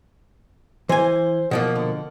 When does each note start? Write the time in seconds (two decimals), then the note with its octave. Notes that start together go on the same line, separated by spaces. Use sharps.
0.89 E3 C5 G#5
1.51 B2 F3 A#3 F#5
1.75 D3